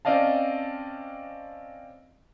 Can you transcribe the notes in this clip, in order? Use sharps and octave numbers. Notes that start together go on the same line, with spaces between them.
C4 C#4 D5 D#5 F5 A5